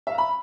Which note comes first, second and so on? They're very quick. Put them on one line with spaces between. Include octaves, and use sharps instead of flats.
E5 F5 A#5 B5